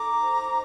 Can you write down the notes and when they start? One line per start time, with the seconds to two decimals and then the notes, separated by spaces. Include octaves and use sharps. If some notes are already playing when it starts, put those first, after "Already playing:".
Already playing: D#4 A4 A#5 D6
0.19 C5
0.48 D#4